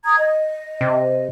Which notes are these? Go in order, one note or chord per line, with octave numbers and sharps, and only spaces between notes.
A#5 D#6 G#6
D#5
C3